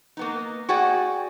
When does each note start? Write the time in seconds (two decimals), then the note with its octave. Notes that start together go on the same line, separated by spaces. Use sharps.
0.17 A#3 B3 D#4
0.69 F#4 G#4 D5 F#5 G5